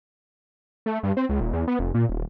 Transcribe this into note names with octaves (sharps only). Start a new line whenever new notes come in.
A3
G2
C4
C#2
D#1
E2
B3
F1
A#2
D#1